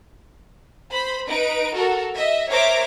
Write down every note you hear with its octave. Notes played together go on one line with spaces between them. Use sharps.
C5 B5
D#4 B4 D7
F#4 A4 A#4
D#5 E5
A#4 C5 C#5 E5 A#5 D6